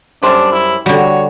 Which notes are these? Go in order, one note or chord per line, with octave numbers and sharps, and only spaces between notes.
F#2 G3 D4 C5
E4
D3 G3 F#4 C#5